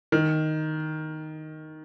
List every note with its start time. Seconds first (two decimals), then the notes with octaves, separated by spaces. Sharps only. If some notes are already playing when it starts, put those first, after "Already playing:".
0.12 D#3